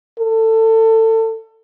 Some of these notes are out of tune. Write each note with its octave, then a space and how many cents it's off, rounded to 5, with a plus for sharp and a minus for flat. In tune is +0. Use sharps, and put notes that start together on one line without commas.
A4 +25